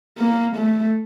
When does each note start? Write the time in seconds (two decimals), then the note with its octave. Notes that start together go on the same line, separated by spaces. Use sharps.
0.18 A#3
0.57 A3